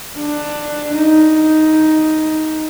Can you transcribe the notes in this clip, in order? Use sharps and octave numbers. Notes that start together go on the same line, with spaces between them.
D4
D#4